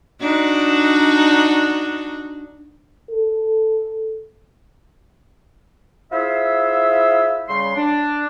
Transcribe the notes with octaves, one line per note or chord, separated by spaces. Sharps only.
D4 D#4 F#4
A4
E4 F4 G#4 C5 E5
C#3 G3 C6
D4